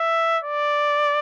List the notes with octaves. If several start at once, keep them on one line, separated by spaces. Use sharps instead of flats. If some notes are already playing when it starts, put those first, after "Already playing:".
Already playing: E5
D5